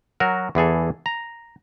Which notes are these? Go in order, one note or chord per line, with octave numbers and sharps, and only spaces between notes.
F#3 F#4 A#4
E2 E3 G#4 A4
A#5